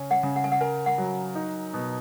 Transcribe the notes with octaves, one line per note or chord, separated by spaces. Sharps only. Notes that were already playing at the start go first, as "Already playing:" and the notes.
Already playing: C#3 C#4
F#5
C#3
F#5
G#5
F#5
A#4 G#5
F#5
F#3
D#4
B2